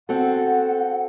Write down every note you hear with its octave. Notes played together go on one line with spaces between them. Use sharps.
C4 F#4 A4 F#5